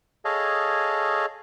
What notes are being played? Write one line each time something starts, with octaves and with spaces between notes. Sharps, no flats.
G#4 A4 C#5 D#5 F5 A5